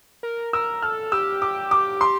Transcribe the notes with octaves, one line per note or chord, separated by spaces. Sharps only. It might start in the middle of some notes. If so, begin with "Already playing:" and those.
A#4
A#4 E6
A4 F6
G4 E6
D6
D6
C6